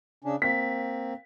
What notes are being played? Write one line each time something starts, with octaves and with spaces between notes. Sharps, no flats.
C#3 C#4 D4
A#3 C4 B6